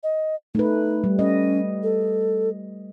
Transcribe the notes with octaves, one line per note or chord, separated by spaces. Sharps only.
D#5
A3 D#4 B4
G3
C#4 D#5
A4